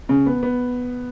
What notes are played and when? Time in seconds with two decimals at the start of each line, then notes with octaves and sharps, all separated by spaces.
0.09 C#3
0.26 B3
0.43 B3